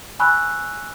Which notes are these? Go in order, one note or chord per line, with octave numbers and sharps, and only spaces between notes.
G#5 B5 C#6 E6 F#6